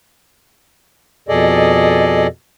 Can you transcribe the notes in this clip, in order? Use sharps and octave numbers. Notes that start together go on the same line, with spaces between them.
F2 B2 G#4 A4 D5 D#5